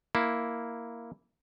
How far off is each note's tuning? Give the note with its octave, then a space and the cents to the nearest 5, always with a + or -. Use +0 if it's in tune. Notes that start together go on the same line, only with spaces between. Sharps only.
A#3 +0 E4 +0